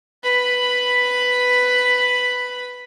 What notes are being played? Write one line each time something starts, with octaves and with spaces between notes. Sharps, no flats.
B4 B5